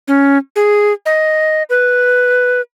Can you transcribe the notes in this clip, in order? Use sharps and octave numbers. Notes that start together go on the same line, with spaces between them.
C#4
G#4
D#5
B4